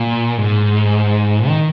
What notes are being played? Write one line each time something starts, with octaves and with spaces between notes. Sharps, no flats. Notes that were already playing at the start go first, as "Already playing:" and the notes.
Already playing: A#2
G#2
D#3